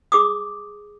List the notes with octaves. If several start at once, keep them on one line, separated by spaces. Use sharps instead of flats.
G#4 D6 D#6